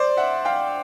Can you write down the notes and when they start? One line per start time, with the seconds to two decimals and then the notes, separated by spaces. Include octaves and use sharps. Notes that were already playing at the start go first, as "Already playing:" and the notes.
Already playing: C5 D5
0.17 E5 F#5
0.45 F5 G5